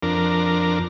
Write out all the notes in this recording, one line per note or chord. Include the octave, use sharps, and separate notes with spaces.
F2 D4 A#4